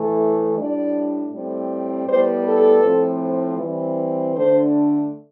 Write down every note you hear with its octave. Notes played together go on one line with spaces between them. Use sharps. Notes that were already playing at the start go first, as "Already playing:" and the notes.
Already playing: A2 E3 A3
A2 G3 D4 D5
A2 G3 C4
A2 G3 B3 C5
A4
A2 F3 C4
E3 G3 C4
D3 A3 D4 C5